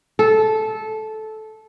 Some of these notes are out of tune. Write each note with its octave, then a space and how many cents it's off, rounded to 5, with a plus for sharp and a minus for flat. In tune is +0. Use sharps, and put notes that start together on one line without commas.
A4 -15